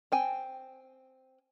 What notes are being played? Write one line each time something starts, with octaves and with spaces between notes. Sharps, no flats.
C4 G5 G#5